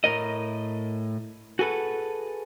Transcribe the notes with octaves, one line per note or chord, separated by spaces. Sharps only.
A2 A#4 D#5
F#4 G#4 A4 B4